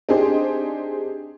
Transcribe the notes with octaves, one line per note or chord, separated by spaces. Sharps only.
C4 D4 D#4 G4 G#4 C5